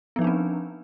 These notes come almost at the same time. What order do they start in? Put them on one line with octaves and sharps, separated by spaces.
B3 F3 D#4 D4 C4